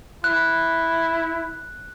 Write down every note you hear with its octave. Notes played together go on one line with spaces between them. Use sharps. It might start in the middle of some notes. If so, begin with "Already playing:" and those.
E4 F#6